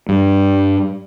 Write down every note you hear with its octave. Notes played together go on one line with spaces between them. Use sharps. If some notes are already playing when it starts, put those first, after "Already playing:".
G2